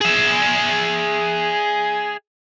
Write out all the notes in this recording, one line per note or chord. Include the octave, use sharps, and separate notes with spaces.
G#4 E5